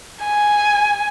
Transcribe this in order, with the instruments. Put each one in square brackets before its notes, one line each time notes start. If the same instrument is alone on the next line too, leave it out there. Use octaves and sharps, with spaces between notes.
[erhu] G#5